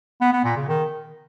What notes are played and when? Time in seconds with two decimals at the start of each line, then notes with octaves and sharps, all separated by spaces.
0.21 B3
0.33 B3
0.45 A#2
0.56 C#3
0.68 D#3